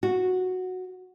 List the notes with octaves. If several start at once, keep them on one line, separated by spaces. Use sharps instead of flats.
F#4